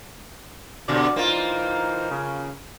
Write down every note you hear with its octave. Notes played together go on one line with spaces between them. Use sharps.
B2 D3 F#4 D5
E3 A#3 D#4 F4 C5
C#3